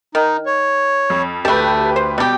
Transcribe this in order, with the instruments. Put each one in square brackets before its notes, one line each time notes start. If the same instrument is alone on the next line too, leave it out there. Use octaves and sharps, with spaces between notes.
[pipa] D#3 [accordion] D#4
[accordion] C#5
[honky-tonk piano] F2
[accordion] D2 [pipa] A3 A5 [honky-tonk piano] G4 B4
[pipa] C5
[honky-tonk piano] B2 G5 [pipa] G3 G4